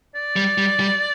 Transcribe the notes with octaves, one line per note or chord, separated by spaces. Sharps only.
D5
G3
G3
G3